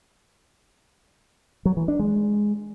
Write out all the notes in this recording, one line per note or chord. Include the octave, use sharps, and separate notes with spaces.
F#3
E3
D4
G#3